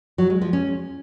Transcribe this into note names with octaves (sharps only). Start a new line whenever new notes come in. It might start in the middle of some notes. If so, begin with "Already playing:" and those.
F#3
G#3
F3
C#4